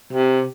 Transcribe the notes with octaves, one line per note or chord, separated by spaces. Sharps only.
C3